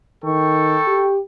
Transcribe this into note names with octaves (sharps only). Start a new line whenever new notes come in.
D#3 A4 G5 C#6
G4